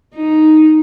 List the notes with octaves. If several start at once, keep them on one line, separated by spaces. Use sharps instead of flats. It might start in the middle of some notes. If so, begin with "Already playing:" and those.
D#4